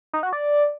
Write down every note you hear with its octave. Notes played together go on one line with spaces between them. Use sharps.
D#4
F#4
D5